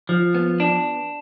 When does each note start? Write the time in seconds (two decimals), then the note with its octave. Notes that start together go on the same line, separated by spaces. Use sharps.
0.09 F3
0.35 B3
0.60 D4